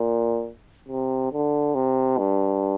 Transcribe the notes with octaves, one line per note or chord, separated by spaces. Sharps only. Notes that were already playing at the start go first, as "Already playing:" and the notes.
Already playing: A#2
C3
D3
C3
G2